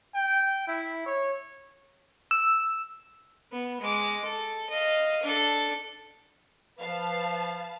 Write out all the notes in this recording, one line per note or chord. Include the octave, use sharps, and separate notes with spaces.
G5
E4
C#5
E6
B3
G#3 D6
A4
D#5 F5
D4 A4
F3 B4 F5 A5